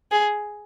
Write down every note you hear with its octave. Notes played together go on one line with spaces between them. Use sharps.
G#4